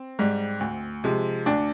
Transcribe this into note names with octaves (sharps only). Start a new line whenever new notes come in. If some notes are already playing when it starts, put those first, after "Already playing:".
Already playing: C4
G#2 G3
D2
C3 F3 G#3
D2 D4